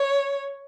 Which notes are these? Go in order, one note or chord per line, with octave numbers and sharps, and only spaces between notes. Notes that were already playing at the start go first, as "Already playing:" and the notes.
Already playing: C#5